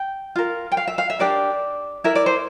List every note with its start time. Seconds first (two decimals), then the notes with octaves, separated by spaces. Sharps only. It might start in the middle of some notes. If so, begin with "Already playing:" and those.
Already playing: G5
0.36 F4 A#4
0.72 G5
0.77 F5
0.87 E5
0.98 F5
1.10 E5
1.19 D4 G4 A#4 D5
2.04 E4 A#4 E5
2.15 D5
2.26 C5